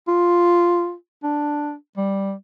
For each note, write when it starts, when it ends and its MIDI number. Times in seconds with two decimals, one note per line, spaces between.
0.08 0.94 65
1.23 1.74 62
1.97 2.33 55